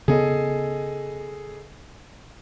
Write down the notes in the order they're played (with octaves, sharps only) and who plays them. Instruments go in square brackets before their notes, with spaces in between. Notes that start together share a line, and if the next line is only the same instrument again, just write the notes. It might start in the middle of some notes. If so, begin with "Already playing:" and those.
[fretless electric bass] C#3 B3 [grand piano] G#4 A4 D#5